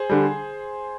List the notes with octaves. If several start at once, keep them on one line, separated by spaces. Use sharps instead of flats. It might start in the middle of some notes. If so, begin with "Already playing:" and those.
Already playing: G#4 C5
D3 G3